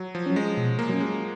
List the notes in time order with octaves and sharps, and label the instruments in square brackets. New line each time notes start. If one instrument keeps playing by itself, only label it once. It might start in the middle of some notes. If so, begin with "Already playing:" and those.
Already playing: [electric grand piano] F#3
F3
[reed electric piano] F#3 C#4
[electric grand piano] G#3
[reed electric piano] B2
[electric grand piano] A#3
[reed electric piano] F#3 C#4
[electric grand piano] G#3